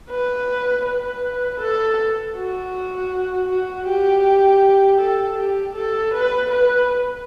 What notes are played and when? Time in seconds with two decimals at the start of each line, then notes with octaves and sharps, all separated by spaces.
0.10 B4
0.86 B4
1.60 A4
2.36 F#4
3.49 F#4
3.87 G4
5.01 A4
5.38 G4
5.75 A4
6.14 B4
6.51 B4